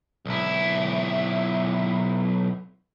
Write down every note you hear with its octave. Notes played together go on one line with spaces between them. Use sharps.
B1 E4